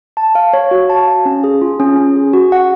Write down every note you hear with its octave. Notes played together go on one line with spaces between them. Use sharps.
A5
F5
C#5
F#4
A5
F5
C#4
G#4
F4
C#4
C#4
G#4
F#4
F#5